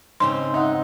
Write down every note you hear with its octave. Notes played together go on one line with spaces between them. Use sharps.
G#2 C#3 C4 C6
D#4 E5 F#5